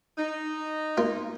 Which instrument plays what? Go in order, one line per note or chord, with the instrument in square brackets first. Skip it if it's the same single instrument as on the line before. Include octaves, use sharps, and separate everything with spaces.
[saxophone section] D#4
[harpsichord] A#3 F4